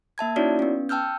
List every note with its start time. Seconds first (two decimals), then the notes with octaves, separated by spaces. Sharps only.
0.18 A#3 E5 A5 G#6
0.36 C#4 D#4 E4 F#4 C#5 D5
0.59 B3 C#4
0.89 G5 A5 E6 F6 G6